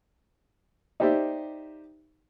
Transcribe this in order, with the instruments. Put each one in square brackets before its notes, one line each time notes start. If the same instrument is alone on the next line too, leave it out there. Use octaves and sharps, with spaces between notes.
[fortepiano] D#4 G4 C5 D5 E5